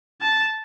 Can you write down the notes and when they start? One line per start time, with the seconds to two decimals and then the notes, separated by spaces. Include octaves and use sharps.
0.21 A5